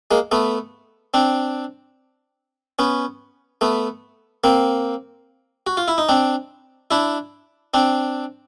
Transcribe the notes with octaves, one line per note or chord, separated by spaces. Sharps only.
G#3 A#3
A3 B3
C4 D4
B3 C#4
A3 B3
A#3 C4
F#4
F4
E4
D#4
C4 D4
D4 E4
C4 D4